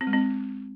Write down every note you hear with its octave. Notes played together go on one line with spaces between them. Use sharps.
C4
G#3
C4